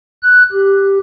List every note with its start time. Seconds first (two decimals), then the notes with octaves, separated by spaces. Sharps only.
0.23 F#6
0.52 G4